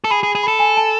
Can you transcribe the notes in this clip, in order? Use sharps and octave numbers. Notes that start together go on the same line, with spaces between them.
A4
G#4 B5
G#4
G#4
A4 B5
G#5
A5